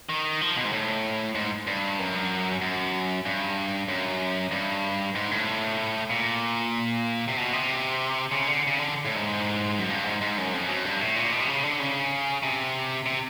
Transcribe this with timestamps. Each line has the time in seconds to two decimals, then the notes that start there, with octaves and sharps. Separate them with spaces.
0.09 D#3
0.41 F3
0.57 B2
0.65 G#2
0.73 A2
1.35 G#2
1.67 G2
1.99 F#2
2.62 F#2
3.26 G2
3.88 F#2
4.51 G2
5.15 G#2
5.31 A2
6.10 A#2
7.28 C3
7.37 B2
7.53 C3
8.32 C#3
8.47 D3
8.67 C#3
8.79 D3
9.05 A2
9.16 G#2
9.79 F#2
9.89 G2
10.05 G#2
10.21 G#2
10.38 F#2
10.53 F2
10.68 F#2
10.85 G2
11.01 A2
11.16 A#2
11.32 B2
11.41 C3
11.48 C#3
11.63 D3
11.79 C#3
12.43 C3
13.06 C3